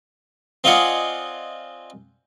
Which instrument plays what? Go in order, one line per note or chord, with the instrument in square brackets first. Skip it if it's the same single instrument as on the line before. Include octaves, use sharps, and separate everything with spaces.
[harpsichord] C4 F4 D5 D#5 F#5 G#5